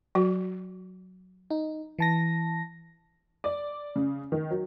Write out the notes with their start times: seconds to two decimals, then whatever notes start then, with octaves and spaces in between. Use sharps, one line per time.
0.15 F#3 F#4
1.50 D#4
1.99 E3 A5 A#6
3.44 D5
3.96 C#3
4.32 D#3
4.51 F#3